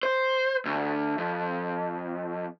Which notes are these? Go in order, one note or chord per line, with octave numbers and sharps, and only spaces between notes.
C5
D2
F2